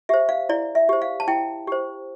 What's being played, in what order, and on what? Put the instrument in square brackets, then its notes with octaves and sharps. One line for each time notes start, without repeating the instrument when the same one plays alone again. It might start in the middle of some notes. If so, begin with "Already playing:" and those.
[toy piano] G4 C5 E5
F5
E4 D5
E5
G4 C5
F5
A5
E4 G5
G4 C5